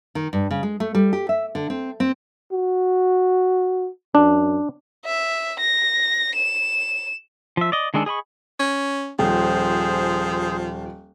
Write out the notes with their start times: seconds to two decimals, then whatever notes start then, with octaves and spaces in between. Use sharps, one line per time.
0.15 D#3
0.33 G2
0.51 C#3
0.63 G#3
0.80 A3
0.95 G3
1.13 G4
1.29 E5
1.55 D3
1.70 C4
2.00 C4
2.52 F#4
4.15 F#2 D4
5.05 E5
5.60 A#6
6.35 E7
7.57 F3 E5
7.72 D5 D#5
7.94 D#3 G#3 D4 G#4 A4
8.06 G#4 D#5 B5 C#6
8.60 C#4
9.19 D#1 F3 G#4 C5